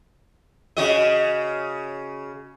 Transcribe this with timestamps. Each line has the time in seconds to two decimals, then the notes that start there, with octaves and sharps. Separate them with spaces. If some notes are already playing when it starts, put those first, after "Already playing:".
0.77 C#3 F#4 D#5